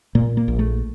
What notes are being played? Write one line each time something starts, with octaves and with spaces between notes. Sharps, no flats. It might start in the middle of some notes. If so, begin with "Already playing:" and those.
A#2 A#3
A#3
A#1
A3